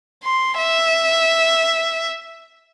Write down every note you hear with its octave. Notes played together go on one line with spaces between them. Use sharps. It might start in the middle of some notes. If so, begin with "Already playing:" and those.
C6
E5